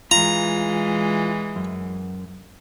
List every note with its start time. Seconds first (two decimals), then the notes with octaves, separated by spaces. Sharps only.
0.11 E3 G#3 F4 A#5
1.56 F#2